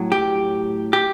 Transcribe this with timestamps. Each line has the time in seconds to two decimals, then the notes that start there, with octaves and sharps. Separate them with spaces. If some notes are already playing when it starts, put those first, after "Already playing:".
Already playing: A2 F#3
0.12 G4
0.93 G4